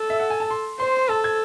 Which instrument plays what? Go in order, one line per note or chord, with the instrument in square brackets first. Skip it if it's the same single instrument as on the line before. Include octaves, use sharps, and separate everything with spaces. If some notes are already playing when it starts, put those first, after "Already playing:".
Already playing: [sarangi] A4
[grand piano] E5
F#5
G#5
A5
C6
[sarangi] C5 [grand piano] C6
[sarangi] A4 [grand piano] A5
[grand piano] G#6